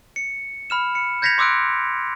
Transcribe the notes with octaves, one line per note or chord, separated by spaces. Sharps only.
C#7
B5 F6 E7
C#7
G6 G#6 A#6 B6 C#7 F7
C6 D6 E6 F#6 D7